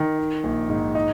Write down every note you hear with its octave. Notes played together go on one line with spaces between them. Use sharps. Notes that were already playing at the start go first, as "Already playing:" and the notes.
Already playing: D#3
D#4
A#1
G#2
D#4